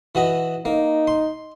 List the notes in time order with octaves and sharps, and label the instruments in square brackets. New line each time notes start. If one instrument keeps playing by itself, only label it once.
[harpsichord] E3 F#4 D#5
[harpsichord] A#3 [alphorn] D#4
[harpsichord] C6